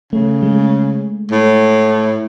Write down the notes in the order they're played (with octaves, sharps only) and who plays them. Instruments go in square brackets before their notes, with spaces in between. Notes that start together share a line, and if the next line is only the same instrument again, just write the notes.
[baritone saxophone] C#3 [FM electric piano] A3
[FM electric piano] G#3
[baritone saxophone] A2